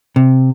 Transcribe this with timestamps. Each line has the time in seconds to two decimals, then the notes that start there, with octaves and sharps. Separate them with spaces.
0.16 C3